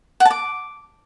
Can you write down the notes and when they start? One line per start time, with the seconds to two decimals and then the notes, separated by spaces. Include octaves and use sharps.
0.20 F#5
0.25 A5
0.31 D6